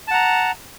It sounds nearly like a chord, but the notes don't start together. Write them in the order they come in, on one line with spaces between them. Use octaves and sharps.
A5 F#5 A#5